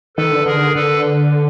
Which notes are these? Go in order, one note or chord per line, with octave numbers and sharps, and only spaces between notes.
D#3 A4 B4
D3
D3 G#4 A#4
D3 A4 B4